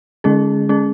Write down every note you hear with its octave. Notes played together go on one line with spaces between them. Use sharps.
D3 G#3 C#4 G#4
G#3 C#4 G#4